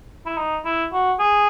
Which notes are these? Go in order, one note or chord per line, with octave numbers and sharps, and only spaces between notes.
E4
D#4
E4
F#4
G#4